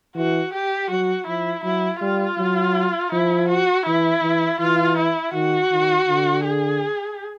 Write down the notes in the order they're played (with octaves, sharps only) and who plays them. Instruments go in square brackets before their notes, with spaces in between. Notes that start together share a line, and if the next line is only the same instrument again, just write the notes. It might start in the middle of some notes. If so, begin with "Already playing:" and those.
[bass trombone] E3 [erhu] F#4
[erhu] G4
[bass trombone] F#3 [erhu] F#4
[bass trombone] F3 [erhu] E4
[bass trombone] F#3 [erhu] E4
[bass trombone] G3 [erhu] F4
[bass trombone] F#3
[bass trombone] F3 [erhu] E4
[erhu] F#4
[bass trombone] E3 [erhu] E4
[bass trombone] E3
[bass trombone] E3 [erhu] F4
[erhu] E4
[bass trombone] D#3 [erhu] F#4
[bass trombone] D#3
D3
[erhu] G#4